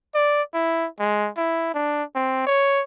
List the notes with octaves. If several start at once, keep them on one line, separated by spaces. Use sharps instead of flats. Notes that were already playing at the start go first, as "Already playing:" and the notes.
D5
E4
G#3
E4
D4
C4
C#5